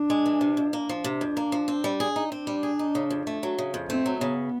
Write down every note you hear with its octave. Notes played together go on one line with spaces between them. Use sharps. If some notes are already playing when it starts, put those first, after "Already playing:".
Already playing: D4
G#3
E3
C3
F2
A#3
F3
C3 D4
F2
A#3
F3
C4
G3
G#4
D#4
C4 D4
G3
G#4
D#4
C#3
F2
A3
F#3
C#3
F2
A3 C4
F#3
C#3 B3